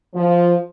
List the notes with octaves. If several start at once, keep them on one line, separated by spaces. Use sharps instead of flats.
F3